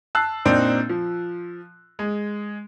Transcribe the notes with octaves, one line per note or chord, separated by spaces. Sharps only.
A5 E6 F#6 C7
A#2 C4 D4 D#4
F3
G#3